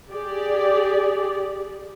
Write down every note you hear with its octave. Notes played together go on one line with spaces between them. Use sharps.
G4 G#4 D5